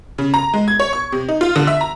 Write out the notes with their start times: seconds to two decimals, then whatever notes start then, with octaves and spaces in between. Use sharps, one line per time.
0.18 C#3
0.34 A#5
0.54 G#3
0.68 G#6
0.80 C#5
0.93 C#6
1.12 C3
1.29 D#4
1.41 F4
1.56 D3
1.67 E5
1.81 A#5